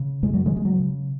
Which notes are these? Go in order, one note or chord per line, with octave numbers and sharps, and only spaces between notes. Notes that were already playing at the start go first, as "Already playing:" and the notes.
Already playing: C#3
F#2 G#3
F#3
D#3 G#3
C#3
G#3
F#3
C#3